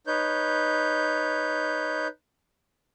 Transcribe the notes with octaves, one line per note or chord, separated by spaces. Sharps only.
D#4 B4 C#5 G6